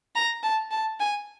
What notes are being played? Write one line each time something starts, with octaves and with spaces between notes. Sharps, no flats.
A#5
A5
A5
G#5